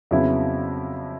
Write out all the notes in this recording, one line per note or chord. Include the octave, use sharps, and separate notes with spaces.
F2 C#3 F#3 B3 E4